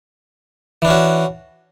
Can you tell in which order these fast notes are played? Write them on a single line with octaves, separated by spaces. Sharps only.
E3 D4 C#4 F#4